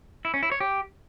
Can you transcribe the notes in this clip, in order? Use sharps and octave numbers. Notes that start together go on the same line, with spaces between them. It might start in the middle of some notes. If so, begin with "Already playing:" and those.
E4
C#4
E4
C#5
G4